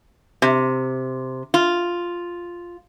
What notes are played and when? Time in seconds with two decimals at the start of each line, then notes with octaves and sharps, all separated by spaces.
0.42 C3
1.54 F4